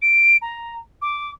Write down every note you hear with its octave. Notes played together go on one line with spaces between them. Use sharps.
D7
A#5
D6